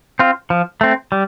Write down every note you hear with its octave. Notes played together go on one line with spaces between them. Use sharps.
C4 F4
F3
A3 C4
G3